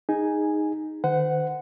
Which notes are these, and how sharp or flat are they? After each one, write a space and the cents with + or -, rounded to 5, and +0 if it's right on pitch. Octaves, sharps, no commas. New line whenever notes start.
D#4 +0 G#4 -15 G#5 +0
D#3 -35 C5 -35 F#5 +0